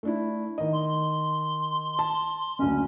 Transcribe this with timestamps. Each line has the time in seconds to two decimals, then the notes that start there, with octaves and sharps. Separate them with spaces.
0.03 A3 D4 E4
0.58 D#3 D#5
0.73 C6
1.99 A5
2.59 F#1 D2 C#4